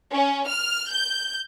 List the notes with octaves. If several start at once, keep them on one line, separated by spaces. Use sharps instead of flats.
C#4
F6
G6